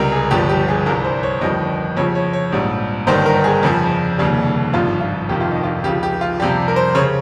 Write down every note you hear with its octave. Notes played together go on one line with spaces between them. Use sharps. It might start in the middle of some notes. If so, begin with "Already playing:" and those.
Already playing: C#2 C3 G3 A#4
G#4
G1 G2 F3 G4
G4
G#4
C2 C3 G3 A#4
C5
C#5
G1 F2 D#3 G3 D#5
F2 C#3 F3 C#5
C#5
C#5
A#1 G#2 G3
G1 G2 D#3 C5
A#4
G#4
F2 C#3 F3
F1 D#2 C#3 G3
G#1 G2 F3 F4
F4
F1 F2 D#3 G4
F4
D#4
F4
C#2 C#3 F3 G4
G4
F4
F2 C3 G3 G4
A#4
C5
C#3 C#5